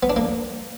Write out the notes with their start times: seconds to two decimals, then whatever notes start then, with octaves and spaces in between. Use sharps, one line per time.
0.03 B3
0.10 D4
0.16 A#3